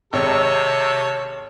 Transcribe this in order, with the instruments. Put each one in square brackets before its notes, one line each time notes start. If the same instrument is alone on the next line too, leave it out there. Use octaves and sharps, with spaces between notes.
[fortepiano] G#1 [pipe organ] C3 [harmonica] A4 [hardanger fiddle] C#5